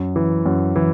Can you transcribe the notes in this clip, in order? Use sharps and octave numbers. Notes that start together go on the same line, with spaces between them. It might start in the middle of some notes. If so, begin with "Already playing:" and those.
Already playing: F#2
E3
F#2
E3